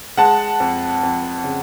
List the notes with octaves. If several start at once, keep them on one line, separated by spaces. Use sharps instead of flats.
G#3 F#5 A5
F2
F2
C#3